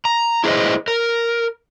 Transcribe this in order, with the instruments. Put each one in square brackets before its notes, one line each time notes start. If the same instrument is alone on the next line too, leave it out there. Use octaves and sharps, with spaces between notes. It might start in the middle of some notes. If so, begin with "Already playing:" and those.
[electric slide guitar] A#5
E4 G#4 B4 C5 D#5
A#4